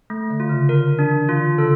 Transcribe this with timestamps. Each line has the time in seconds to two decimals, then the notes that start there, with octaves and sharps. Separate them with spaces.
0.10 A3
0.30 D3
0.40 F4
0.49 C#3
0.69 D3 A#4
0.99 E3 D4
1.29 D3 F4
1.58 C#3 A4